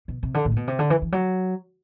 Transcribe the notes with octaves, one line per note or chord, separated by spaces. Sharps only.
B2
C3
D3
A2
C3
B2
C3
D3
E3
E3
F#3